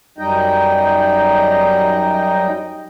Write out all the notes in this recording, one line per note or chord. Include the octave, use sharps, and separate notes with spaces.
F#2 G3 D#4 D#5 G5